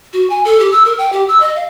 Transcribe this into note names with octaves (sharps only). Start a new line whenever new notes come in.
F#4
G#5
A4
G4
E6
A#4
G5
G4
E6
D#5
F5